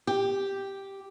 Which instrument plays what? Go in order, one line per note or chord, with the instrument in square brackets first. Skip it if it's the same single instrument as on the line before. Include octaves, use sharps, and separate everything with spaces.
[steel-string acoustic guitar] G4